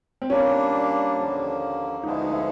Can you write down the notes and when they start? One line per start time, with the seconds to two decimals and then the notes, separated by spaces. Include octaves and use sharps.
0.22 C4
0.30 A#2 G3 A#3 C#4 D4
1.17 D#2 D3 F3 A#3
2.03 D2 D3 F3 G#3 B3 D#4
2.12 E4
2.22 D#4
2.33 E4